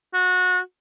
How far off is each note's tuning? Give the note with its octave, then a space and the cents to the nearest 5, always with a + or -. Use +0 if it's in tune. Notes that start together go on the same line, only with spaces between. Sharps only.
F#4 -25